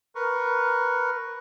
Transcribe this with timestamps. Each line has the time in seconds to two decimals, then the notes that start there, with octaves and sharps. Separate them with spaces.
0.15 A#4 B4 C#6